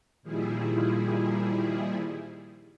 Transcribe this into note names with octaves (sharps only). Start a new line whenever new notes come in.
A#2 D#3 F3 G3 E4 G#4